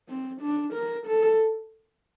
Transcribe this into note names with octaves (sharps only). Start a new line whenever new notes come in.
C4
D4
A#4
A4